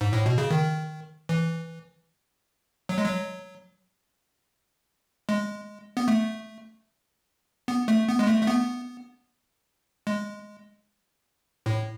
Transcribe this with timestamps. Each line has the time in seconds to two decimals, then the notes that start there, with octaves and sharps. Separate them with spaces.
0.01 G#2
0.13 A2
0.26 B2
0.38 C#3
0.50 D#3
1.29 E3
2.89 F#3
2.98 G#3
3.05 F#3
5.29 G#3
5.97 B3
6.08 A3
7.68 B3
7.88 A3
8.08 B3
8.19 G#3
8.27 A3
8.43 A3
8.47 B3
10.07 G#3
11.66 A2